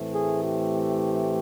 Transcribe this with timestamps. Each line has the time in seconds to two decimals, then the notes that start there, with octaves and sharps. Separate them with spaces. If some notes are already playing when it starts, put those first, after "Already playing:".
Already playing: A2 E3 A3 C4
0.12 G#4
0.43 G4